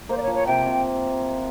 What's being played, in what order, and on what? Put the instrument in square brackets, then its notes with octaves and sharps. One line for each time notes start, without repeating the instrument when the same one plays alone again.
[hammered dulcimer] A#3 [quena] C5
[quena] D5
C#5
[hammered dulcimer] F3
[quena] C#5
[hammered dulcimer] C3 [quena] G5
[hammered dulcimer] C3